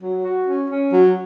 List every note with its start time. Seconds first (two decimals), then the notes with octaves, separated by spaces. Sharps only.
0.01 F#3
0.24 F#4
0.47 C#4
0.70 C#4
0.93 F#3